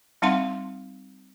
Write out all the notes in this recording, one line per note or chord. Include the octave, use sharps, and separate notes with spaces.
G3 C4 D#4 F5 F#5 C6